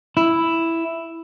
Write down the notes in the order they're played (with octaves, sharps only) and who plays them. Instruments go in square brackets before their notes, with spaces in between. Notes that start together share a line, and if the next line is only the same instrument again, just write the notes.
[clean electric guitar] E4